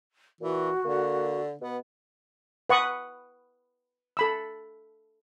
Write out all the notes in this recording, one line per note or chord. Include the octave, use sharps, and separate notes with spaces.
A#2 E3 F#4
D3 A#3
B2 B3
B4 F#5 C#6 D#6
A4 B5 E6